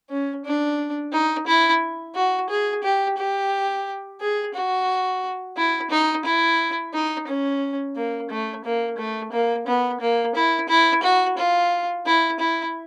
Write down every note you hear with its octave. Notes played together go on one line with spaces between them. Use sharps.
C#4
D4
D#4
E4
F#4
G#4
G4
G4
G#4
F#4
E4
D#4
E4
D#4
C#4
A#3
A3
A#3
A3
A#3
B3
A#3
E4
E4
F#4
F4
E4
E4